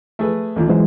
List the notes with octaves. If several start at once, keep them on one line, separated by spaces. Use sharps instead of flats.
A3 G#4 B4
A1 D#2 A#2
E3 F#3 G#3 C5